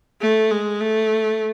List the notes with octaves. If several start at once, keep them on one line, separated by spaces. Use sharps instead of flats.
A3
G#3
A3